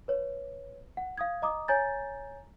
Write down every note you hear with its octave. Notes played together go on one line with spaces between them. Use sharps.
B4 C#5
F#5
F5 D#6 G#6
D#5 A#5 D6 D#6
C#5 G#5 A#5 G6 A6